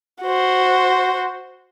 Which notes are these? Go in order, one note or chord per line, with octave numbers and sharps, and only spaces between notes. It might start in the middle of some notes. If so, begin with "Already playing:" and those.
F#4 C5